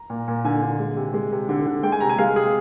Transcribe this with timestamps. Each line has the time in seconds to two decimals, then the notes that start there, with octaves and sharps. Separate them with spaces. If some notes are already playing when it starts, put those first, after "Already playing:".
Already playing: A#5
0.10 A#2
0.28 A#2
0.45 D3 G#5
0.62 D3
0.79 G#3
0.97 C3
1.14 G#3
1.32 C3
1.49 D3
1.66 D3
1.83 G#3 G5
1.92 G#5
2.00 C3 A#5
2.10 G#5
2.18 G#3 F5
2.36 C3 G#4